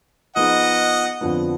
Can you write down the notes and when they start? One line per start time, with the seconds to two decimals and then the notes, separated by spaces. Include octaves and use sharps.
0.36 F3 B3 D#4 G#4 D#5 F#5
1.21 F2 D3 F3 B3